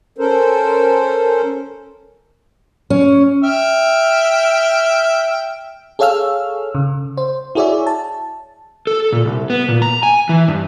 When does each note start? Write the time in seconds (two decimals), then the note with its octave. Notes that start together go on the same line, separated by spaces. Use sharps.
0.18 C#4 A4 A#4 C5
2.90 C#4
3.44 E5 G5 F6
5.99 G#4 A4 C#5 F5 E6 F6
6.75 C#3
7.18 C5
7.55 E4 F#4 G#4 C#5 D5 E5
7.87 A5
8.87 A4
9.12 A#2
9.25 C2
9.50 B3
9.68 A#2
9.82 A#5
10.03 G#5
10.29 E3
10.48 G2